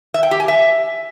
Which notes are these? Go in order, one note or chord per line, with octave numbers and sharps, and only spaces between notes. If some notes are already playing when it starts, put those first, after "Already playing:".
E5
G5
G4
G#5
E5